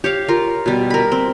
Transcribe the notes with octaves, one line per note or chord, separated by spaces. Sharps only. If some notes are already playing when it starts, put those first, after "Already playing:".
G4 C#5 F5
F4 A#4
B2 G3
A#4 B5
C4